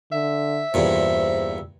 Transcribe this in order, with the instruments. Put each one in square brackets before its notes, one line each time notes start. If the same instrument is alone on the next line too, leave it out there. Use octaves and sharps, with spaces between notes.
[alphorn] D3 [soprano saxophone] E5
[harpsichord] E2 G2 A#2 [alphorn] C5